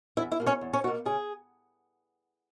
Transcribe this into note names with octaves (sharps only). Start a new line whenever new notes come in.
E2 E4 E5
E4 E5
B2 A#3
C#4 C#5
E2
C#4 C#5
B2 A#3 F#4
C#3 G#4